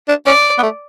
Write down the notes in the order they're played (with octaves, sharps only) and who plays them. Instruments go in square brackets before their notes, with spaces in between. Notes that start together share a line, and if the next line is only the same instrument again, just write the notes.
[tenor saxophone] D4
[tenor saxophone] C#4 [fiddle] D5
[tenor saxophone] B3
A3